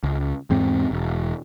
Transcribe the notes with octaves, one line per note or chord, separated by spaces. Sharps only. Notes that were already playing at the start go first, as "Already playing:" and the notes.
C#2
E2 G#2 C4
E1